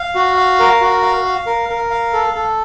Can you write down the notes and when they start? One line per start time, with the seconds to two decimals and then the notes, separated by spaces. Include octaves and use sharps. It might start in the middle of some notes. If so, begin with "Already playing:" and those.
Already playing: F5
0.15 F#4
0.36 F5
0.60 A#4
0.81 F#4
1.02 F5
1.25 F5
1.46 A#4
1.69 A#4
1.90 F5
2.13 A4
2.34 A4